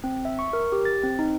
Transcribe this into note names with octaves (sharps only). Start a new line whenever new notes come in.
C4
E5
C#6
A#4
G4
A6
C4
D#4